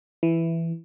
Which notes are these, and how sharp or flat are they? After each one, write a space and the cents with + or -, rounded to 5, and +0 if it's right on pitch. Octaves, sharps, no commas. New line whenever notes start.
E3 +10 E4 +0